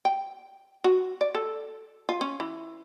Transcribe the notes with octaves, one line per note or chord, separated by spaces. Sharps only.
G5
F#4
D5
A4
F4
C#4
E3